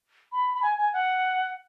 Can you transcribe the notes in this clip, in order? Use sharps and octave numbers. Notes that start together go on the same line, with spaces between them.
B5
B5
G#5
G#5
F#5